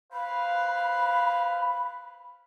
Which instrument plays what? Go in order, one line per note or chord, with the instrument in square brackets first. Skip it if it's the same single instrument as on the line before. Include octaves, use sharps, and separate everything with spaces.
[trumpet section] B4 C5 F5 [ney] B5